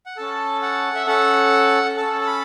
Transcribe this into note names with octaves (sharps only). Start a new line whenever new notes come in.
F#5
C#4 A4 A5
F#5
E5
C#4 A4 F#5
C#4 A4 A5
A5
B5